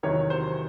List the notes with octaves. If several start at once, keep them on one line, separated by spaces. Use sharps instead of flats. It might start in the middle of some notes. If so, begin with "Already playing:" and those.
E2 C3 D#3 F#3 C#5
C5